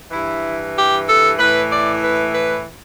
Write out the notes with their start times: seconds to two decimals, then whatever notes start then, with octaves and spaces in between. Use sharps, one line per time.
0.11 G2 E3 E4
0.75 G4
1.07 A4
1.38 A2 E3 B4
1.70 D5
2.02 B4
2.33 B4